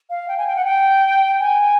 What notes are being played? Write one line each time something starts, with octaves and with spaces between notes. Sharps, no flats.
F5
G5
G#5
G5
F#5
G5
G#5